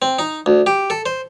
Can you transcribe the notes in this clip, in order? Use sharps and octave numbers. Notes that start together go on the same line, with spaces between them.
C4
D#4
D2
G4
A4
C5